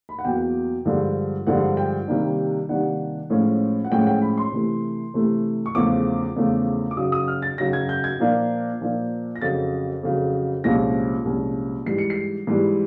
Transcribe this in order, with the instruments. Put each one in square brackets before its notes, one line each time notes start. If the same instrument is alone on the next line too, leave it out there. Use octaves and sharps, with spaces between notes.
[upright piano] B5
F#5
E2 B2 F#3 A#3 G5
G2 D3 F3 G#3
G2 D3 F3 G#3 F#5
G5
C3 D#3 G3 A#3 D4
C3 D#3 G3 A#3 D4 F#5
A2 F3 G#3 C#4
F#5
A2 F3 G#3 C#4 G5
F#5
G5
B5
C6
C3 E3 A3
C3 E3 A3
C#6
E2 C#3 F3 A3 D6
E2 C#3 F3 A3
D6
F#2 C#3 F#3 D#6
D#6
F6
A6
F#2 C#3 F#3 A#6
G#6
G6
G#6
A#2 F3 A#3 D4
A#2 F3 A#3 D4
A#6
F2 C#3 F#3 A6
F2 C#3 F#3
C2 A#2 F3 G#3 C#4 A#6
C2 A#2 F3 G#3 C#4
G#2 E3 G3 C7
C#7
C7
G#2 E3 G3